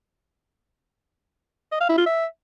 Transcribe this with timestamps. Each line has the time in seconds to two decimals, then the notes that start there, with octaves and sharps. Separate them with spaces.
1.72 D#5
1.80 F5
1.89 E4
1.97 F4
2.06 E5